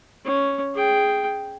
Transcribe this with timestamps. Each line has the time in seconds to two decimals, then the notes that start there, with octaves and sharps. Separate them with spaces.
0.25 C#4
0.74 G#4 G5